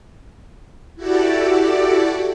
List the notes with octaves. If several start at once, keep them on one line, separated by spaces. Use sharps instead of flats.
E4 F#4 G4 A4 D5